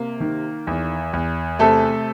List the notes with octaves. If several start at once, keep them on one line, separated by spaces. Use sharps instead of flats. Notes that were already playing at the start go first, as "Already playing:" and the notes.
Already playing: C3 A#3
D#3
E2
E2
C3 A3 A4